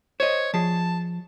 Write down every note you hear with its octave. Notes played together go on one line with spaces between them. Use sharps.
C5 C#5 D#5
F3 G#4 A5